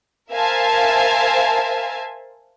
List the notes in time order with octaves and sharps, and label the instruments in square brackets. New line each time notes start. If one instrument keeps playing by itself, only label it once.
[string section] A#4 C5 E5 F5 G#5 A5